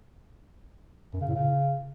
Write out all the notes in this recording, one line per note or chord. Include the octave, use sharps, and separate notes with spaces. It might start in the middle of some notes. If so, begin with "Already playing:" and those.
F#2
C#3
A2
C#3